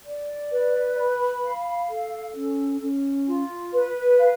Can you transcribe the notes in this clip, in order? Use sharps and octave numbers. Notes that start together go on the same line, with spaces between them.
D5
B4
B5
F5
A4
C#4
C#4
F4
B4
F5